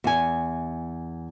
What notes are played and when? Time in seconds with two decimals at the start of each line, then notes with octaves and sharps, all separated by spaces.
0.04 E2 G#5